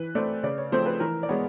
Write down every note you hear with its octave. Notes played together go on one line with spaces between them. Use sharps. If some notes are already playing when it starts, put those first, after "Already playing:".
Already playing: E3 B4
A3 C4 D5
C#3 D5
C#5
F3 A3 C4 C5
B4
E3 A#4
D5
G#3 B3 C#5